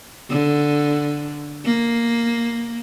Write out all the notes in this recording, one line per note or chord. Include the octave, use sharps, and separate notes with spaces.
D3
A#3